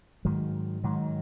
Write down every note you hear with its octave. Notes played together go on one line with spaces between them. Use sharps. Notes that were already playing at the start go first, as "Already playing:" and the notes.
G#2 D#3 F#3
G#2 D#3 F#3